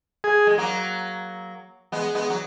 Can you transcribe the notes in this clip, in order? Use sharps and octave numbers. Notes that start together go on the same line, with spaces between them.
G#4
G#3
F#3 A#3
G#3 B3
G#3 B3
F#3